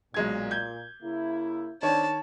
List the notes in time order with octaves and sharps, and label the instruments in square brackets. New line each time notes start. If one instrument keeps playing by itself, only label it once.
[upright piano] B1 G#3 G#6 [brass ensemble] A#2
[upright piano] G6 G#6
[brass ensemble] C#3 A#3 E4
[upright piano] D#3 C#5 [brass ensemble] C4 D4 [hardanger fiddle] A5